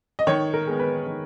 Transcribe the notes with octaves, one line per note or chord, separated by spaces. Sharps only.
D#5
D#3 C#5
A#4
G#3 B3
B4
D#3